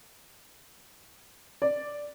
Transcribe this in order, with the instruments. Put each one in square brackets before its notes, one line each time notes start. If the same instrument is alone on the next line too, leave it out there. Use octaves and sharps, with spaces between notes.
[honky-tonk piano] D5